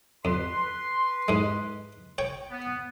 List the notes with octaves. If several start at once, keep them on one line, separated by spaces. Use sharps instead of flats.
F2 B4 C6
G#2 G#3
C#5 G5
B3